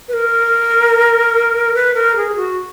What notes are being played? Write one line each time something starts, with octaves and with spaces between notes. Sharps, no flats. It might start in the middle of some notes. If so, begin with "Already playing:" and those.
B4
A#4
B4
A#4
G#4
F#4